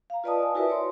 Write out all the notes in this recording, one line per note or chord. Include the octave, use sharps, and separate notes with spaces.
F5 A#5
F4 B4 D5 D#5 A5 D#6
G#5 D#6
E4 F#4 A#4 B4 D5 E5
C#5 C6